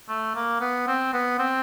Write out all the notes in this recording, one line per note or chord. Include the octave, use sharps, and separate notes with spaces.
A3
A#3
B3
C4
B3
C4